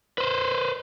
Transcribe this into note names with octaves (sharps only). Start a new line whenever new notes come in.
B4 C5